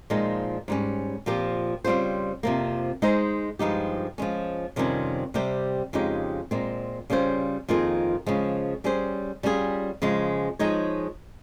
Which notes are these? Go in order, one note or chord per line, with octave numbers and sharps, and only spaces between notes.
A#2 F3 G#3 D#4
G#2 G3 C#4
A#2 F3 C4 G4
C#3 G3 C4 F4 C5
F2 C3 F3 A#3
G#3 D#4 G#4 C5
G2 F3 G#3 D#4 G4
F3 G#3 C#4
F2 C3 D#3 G3 C#4
C3 G3 C4 G4 C5
F2 C#3 G#3 D#4 G4
A#2 G#3 C4
C#3 G3 C#4 F4 C5
F2 D#3 A#3 F4 G#4
C#3 F3 G#3
G3 C#4 G#4 C5
G3 C#4 F4 G#4
C#3 F3 G#3
F3 G#3 D#4 G#4 C#5